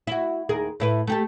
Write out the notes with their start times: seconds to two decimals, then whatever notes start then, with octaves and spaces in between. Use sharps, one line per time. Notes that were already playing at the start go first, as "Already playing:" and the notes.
0.07 E4 F#4
0.49 D#2 G#4 A#4
0.80 A2 E4 B4
1.07 A3 G4 A4